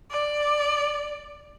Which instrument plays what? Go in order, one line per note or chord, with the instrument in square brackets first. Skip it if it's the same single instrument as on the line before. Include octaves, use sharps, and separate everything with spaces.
[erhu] D5